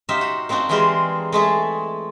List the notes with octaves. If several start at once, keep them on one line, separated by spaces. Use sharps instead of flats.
D#4 G4 C5 E5 F5
F#4
A#3 C4 D4 D#4 F#4
E3 G3 G#3 G#4 A#4 C5
G#3 A3 G#4 A4